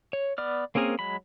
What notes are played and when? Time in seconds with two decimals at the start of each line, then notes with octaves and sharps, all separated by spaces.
0.13 C#5
0.38 B3 D5 F6
0.75 A#3 C4 C#4 G#4 A#4
0.99 F#3 G#3 B5